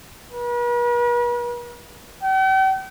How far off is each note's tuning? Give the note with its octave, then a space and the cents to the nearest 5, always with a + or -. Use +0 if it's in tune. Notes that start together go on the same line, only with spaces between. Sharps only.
B4 -45
G5 -45